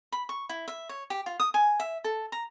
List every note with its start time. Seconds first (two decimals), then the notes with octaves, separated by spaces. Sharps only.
0.12 B5
0.29 C#6
0.49 E4
0.68 E5
0.89 C#5
1.10 G4
1.26 F4
1.40 D#6
1.54 G#5
1.80 E5
2.04 A4
2.32 A#5